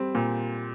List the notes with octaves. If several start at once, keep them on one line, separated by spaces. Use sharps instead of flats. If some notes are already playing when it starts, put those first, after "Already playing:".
Already playing: G3 C4
A#2